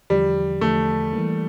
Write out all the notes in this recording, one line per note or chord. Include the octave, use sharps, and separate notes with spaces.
E2 D3 F3 G3
E2 D3 F3 A3
E3 G3 A#3